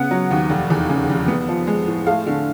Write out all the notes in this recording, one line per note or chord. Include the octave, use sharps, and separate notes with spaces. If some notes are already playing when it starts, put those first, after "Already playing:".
Already playing: C#3 B3 F#5
F#3
D#2
F1
E2
C#3
F1
B3
F3
G#3
A2
A3 F5
D3